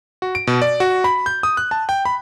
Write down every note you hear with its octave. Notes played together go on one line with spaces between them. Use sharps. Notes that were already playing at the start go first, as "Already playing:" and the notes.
F#4
D7
B2
D5
F#4
B5
G6
D#6
F#6
A5
G5
B5